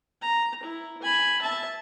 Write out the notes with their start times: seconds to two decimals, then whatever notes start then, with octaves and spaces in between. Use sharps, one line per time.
0.22 A#5
0.63 E4
1.02 G#5 B5
1.42 E5 A5